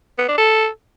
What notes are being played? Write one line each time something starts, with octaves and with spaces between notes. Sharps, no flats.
B3
D4
A4